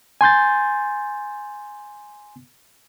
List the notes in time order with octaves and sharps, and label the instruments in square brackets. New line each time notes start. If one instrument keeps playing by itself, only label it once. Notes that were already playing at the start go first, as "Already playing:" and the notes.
[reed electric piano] G#5 C6 G6 A6